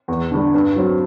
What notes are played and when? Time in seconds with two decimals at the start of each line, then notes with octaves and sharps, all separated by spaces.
0.08 E2
0.31 D3 G3 D4
0.54 G2
0.76 F#3 C4